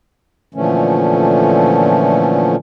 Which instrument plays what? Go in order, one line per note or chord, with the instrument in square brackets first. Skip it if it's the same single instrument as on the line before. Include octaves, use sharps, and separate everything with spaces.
[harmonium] A#2 D3 E3 F3 A3 C#4